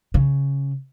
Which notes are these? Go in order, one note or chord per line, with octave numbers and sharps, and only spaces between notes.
C#3